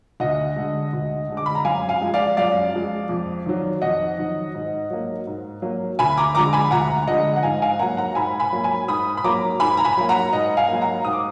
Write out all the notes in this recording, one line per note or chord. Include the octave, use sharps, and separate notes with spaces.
D2 D#5 F#5
D3 G#3
D2
D3 G#3
D6
B5
A#5
F#2 F5 G#5
F5 G#5
F3 G#3
D5 F5
F#2 D5 F5
F3 G#3
F2
D#3 F#3
F2 D#5 F#5
D#3 F#3
G#2
F#3 A#3
G#2
F#3 A#3
D2 G#5 B5
A#5 D6
D3 F3 G#3 A#5 D6
G#5 B5
D2 F#5 A#5
D3 F3 G#3 D#5 F#5
F#5
G#2 F5 G#5
F5 G#5
F#3 A#3 F#5 A#5
F#5 A#5
G#2 G#5 B5
G#5 B5
F#3 A#3
G#5 B5
G#2 B5 D#6
B5
F#3 A#3 A#5 D6
G#2 G#5 B5
A#5
G#5 B5
F#3 A#3
F#5 A#5
G#2 D#5 F#5
F5 G#5
F#3 A#3
F#5 A#5
G#2 D#6
D6